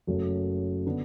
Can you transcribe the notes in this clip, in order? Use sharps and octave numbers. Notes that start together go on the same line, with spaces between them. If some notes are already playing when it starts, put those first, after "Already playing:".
F#1 F#2 F#3 A3
D3 B3 D4